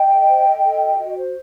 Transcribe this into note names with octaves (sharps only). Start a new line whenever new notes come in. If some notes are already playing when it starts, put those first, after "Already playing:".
Already playing: D#5 G5
A4
C5
A4
A4
F#4
F#4
C5